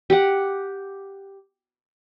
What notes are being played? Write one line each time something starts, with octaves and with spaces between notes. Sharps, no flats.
G4 F#5